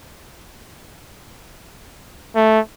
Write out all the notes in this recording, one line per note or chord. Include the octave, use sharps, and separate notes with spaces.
A3